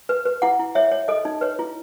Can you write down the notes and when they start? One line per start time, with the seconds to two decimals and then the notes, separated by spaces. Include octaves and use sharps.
0.09 B4
0.26 B4
0.42 E4 F#5
0.60 E4
0.75 C#5 E5
0.91 C#5
1.08 A4 D#5
1.25 D#4
1.41 B4 C#5
1.59 E4